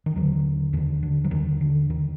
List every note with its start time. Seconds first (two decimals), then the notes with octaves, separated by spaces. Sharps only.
0.06 D#3
0.16 D#2 D3 F#3
0.73 D#2 D3 D#3
1.03 D3
1.24 F#3
1.31 D#2 D3 D#3
1.61 D3
1.89 D#2 D3 D#3